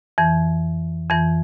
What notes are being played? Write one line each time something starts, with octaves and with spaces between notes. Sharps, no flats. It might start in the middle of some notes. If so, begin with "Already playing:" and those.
F2 E3
F2 E3